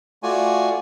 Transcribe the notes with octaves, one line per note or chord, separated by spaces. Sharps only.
A3 F4 F#4 D5 G#5